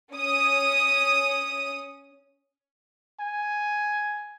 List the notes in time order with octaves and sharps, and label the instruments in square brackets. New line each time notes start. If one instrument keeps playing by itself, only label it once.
[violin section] C#4 D#6
[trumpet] G#5